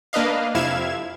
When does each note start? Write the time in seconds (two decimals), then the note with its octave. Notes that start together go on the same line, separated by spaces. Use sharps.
0.13 A#3 D4 B4 D#5 F5
0.55 F2 C3 E4 F5 G#6 E7